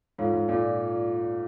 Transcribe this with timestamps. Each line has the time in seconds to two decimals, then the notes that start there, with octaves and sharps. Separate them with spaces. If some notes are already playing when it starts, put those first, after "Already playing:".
0.18 G#2 F4 A4 C#5 F5
0.33 G#2
0.48 A#2 F4 A4 D5 F5